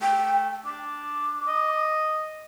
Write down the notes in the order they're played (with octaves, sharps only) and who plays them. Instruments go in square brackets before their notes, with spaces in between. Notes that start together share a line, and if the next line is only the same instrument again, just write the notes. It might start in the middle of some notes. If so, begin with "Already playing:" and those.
[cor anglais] A3 [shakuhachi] G5
[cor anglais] D4 [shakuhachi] D6
[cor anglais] D#5